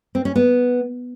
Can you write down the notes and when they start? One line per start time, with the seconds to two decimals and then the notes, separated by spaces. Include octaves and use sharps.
0.15 C4
0.25 C#4
0.36 B3